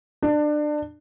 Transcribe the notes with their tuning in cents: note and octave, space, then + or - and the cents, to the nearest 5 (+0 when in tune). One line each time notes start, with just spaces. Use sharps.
D4 +25